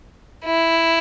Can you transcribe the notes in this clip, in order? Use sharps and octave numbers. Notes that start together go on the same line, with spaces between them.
E4